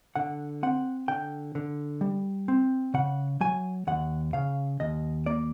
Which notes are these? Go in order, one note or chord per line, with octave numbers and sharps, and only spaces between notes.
D3 F#5
C4 F#5
D3 G5
D3
G3
C4
C#3 F#5
F#3 G#5
D#2 F#5
C#3 F5
D#2 D#5
A#3 D5